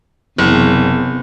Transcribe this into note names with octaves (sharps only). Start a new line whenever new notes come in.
F#1 E2 C3